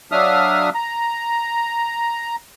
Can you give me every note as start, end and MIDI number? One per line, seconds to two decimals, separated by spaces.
0.12 0.70 54
0.12 0.70 62
0.12 0.70 76
0.12 0.70 77
0.12 0.70 87
0.12 0.70 89
0.75 2.36 82